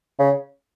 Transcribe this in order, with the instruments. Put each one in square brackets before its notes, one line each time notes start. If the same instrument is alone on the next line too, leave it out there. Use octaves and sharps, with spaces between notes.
[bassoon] C#3